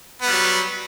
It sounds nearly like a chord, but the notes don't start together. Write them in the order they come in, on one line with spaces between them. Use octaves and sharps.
B3 G3 F#3